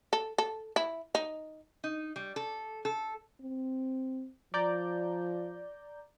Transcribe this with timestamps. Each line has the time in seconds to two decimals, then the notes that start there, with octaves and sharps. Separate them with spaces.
0.13 A4
0.38 A4
0.76 E4
1.15 D#4
1.84 D#4
2.16 G3
2.36 A4
2.85 A4
3.40 C4
4.54 F3 D5 A#5 G6